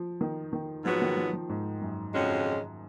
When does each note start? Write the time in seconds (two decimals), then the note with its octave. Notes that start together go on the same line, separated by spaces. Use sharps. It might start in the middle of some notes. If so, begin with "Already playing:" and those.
Already playing: F3
0.21 D#3
0.53 D#3
0.85 G#2 F3 F#3 B3 F#4
1.02 D#3
1.17 F3
1.33 F3
1.49 G#2
1.81 F#2
2.13 F2 C#3 G#3 C#4 F#4